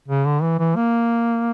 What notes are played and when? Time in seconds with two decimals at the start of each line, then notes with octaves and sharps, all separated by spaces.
0.08 C#3
0.26 D3
0.43 E3
0.59 E3
0.76 A#3